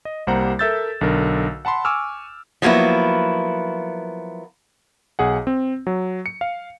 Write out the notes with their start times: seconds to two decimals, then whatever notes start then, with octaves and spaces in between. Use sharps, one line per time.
0.05 D#5
0.27 C2 G3 A#3 C5 F#5 A#5
0.59 A4 A#4 E5 E6 G6 A6
1.01 B1 D3 A#4
1.65 F#5 A5 B5 C6
1.85 G#5 C#6 D6 E6 F6
2.62 F3 F#3 A#3 B3 E4
5.19 B1 G#4 F#5
5.47 C4
5.87 F#3
6.26 C#7
6.41 F5